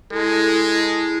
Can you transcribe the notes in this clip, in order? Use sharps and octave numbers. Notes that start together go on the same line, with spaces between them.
G#3 E4 A4